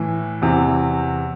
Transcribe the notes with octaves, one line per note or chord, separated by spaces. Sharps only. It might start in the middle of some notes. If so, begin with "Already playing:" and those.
Already playing: A2 E3
E2 C3 E3